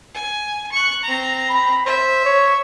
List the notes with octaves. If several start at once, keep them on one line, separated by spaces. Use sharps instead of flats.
G#5
C#6 F#6
C4 A#5
B5
C5 E5
C#5